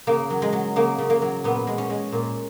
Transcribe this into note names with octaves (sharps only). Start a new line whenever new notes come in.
C#3 A#3
F#3
G#3
F#3
C#3 A#3
C#3
A#3
F#3
A#2 B3
G#3
C#4
G#3
A#2